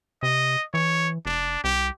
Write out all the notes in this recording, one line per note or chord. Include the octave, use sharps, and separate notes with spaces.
C3 D#5
E3 C#5
F1 D4
C2 G4